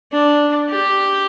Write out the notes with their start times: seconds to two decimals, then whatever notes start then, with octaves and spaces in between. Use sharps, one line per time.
0.12 D4
0.70 G4